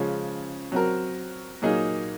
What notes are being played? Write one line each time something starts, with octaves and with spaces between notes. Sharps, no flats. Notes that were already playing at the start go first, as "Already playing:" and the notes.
Already playing: C#3 F3 G#3 C#4
F#3 C4 F#4 A#4
A#2 F#3 A#3 D#4 G#4